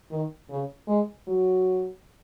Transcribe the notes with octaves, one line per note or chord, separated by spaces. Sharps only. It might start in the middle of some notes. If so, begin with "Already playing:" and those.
D#3
C#3
G#3
F#3